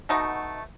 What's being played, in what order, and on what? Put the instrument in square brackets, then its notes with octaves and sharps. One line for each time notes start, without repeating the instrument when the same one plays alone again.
[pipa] B2 A3 D#4 F#4